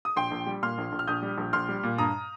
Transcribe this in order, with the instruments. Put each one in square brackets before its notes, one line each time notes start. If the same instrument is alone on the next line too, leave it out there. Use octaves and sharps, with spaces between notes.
[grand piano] D#6
A#1 G5 C6
A#1
G3
A#2 C6 F6
A#1
A#1
F6
A#1 D#6 G6
G3
A#1
A#1 C6 F6
G3
A#2
G2 A#5 D#6